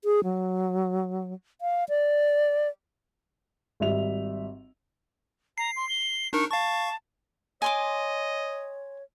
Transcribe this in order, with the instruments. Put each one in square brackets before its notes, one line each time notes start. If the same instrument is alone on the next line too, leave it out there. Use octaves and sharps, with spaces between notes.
[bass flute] G#4
F#3
F5
D5
[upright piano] G#1 G3 E5 F7
[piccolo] A#5 [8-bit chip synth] C7
[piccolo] C6
G7
[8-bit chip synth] D4 D#4 A#4 [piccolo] C#6
[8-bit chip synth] F5 C#6 [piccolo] A5
[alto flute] C#5 [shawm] D#5 [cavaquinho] G#5 C6 D6